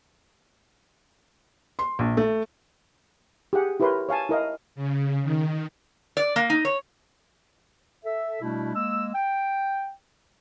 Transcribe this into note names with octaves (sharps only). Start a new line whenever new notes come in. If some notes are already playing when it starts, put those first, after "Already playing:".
C6
A#1
A3
G4 G#4 F#5
E4 G4 A#4 B4 C#5 C6
C#5 F5 G#5 A5
E4 A#4 D#5 F5
C#3
D#3
D5
A#3
D#4
C#5
A4 E5
B2 G3 A3 D4 E4
G#3 A#3 E6
G5